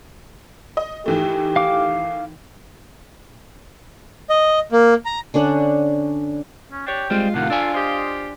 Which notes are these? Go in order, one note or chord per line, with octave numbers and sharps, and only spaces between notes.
D#5
D#3 E3 A3 G4
F5 D6
D#5
A#3
A#5
D3 C#4 D4 F#5
C#4
D4 G4 C#5 G5
G3 G#3 C4 F4
A2 C3 D#3 F5 F#5
D4 A4 D5 G#5
F4 G4 C5 D#5